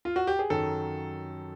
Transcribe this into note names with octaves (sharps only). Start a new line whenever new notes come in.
F4
F#4
G4
G#4
F#2 D#3 F#3 A4